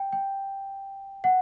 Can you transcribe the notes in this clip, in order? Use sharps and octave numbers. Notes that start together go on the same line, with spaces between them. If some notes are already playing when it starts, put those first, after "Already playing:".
Already playing: G5
G5
F#5